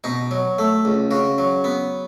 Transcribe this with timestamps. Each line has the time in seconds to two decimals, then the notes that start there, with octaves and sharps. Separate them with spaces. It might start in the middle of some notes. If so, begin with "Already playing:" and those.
0.04 B2 D#4
0.31 F#3
0.59 A3
0.85 C#2
1.11 C#3 F#4
1.38 F#3
1.64 B3